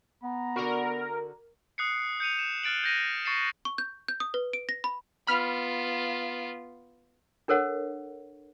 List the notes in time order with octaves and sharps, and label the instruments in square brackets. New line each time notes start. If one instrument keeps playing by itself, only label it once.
[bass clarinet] B3 [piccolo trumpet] A#5
[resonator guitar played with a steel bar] D3 F#4 [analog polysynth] A#4
[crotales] D#6 F#6 C7 C#7
G6 C#7 D#7 F7
E7
F6 F#6 A6 D7 F#7
G6 A#6 D#7
C#6 A6 C7 C#7 E7
[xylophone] C#6
G6
G6
D#6
B4
D7
A#6
B5
[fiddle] B3 F4 [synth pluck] B5 F6
[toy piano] D4 A4 A#4 C#5 F#5